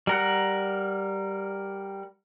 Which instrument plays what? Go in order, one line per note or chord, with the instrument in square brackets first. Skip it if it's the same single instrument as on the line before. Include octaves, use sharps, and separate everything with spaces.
[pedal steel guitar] G3 A#4 F#5